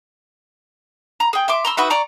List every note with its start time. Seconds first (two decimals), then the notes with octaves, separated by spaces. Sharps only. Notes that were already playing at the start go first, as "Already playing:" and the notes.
1.20 A#5
1.33 G#4 G5
1.48 E5 C6 D6
1.65 A#5 C6 E6
1.77 D#4 F#4 B4 E5
1.90 D5 A#5 C#6